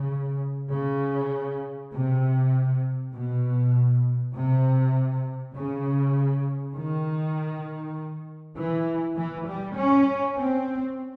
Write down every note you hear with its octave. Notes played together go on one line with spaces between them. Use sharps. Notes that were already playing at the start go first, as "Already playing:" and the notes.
Already playing: C#3
C#3
C3
B2
C3
C#3
D#3
E3
E3
G3
C#4
C4